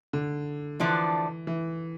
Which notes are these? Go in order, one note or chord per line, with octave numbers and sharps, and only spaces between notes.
D3
D3 E3 F3 A3 D4
E3